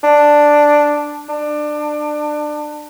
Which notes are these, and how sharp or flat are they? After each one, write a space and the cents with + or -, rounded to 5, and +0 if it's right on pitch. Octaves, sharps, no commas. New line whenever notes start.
D4 +5
D4 +25